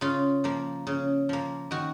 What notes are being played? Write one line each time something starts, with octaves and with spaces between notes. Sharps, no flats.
C#3 F4
F3 A#3
C#3
F3 A#3
D#3 F#4